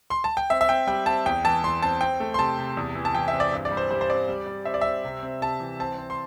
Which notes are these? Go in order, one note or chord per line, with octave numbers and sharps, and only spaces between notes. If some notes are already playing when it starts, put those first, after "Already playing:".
C6
A5
G5
C4 E5
E5
C4 G5
G3 G5
C4 A5
E2 G5
E3 A5
E2 C6
C4 A5
C4 G5
A3
C6
C3 A5
C3
E2
E3
A5
E3 G5
E5
C4
D5
G2
D5
G3
C5
G3 C5
C5
C4 D5
G3
G3
C4 E5
D5
C4 E5
C3
C4
C3 A5
E3
C4 A5
C4
C6